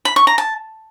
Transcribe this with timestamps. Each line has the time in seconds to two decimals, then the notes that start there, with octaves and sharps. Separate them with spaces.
0.05 B5
0.16 C#6
0.27 A#5
0.38 A5